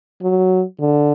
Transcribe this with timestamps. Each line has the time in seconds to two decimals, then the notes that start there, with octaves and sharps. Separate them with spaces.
0.22 F#3
0.80 D3